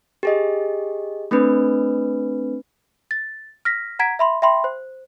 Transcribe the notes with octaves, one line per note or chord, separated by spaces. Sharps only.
G4 G#4 D#5
A3 C4 D4 B4
A6
F6 A#6 B6
F#5 A#5 G#6 B6 D7
E5 B5 C6
E5 G5 B5 C6
C5